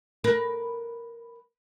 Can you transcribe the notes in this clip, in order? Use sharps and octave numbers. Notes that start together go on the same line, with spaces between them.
A#4 B4